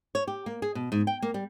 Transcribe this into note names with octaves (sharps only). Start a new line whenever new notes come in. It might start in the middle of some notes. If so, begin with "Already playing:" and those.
C#5
G4
A#3
G#4
B2
G#2
G5
A#3
G3